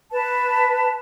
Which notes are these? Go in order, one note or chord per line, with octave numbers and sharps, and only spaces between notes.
B4 A5